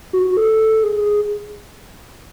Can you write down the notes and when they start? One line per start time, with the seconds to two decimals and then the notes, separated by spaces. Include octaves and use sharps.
0.13 F#4
0.25 F#4
0.37 A4
0.83 G#4